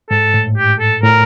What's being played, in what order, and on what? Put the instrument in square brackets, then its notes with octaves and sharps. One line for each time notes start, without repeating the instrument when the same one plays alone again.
[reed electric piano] G#2 [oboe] A4
[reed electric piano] A2
[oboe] G4
A4
[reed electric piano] A2 [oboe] A#4